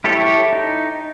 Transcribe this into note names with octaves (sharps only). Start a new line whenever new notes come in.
E4 G4 A4 C#5
D#4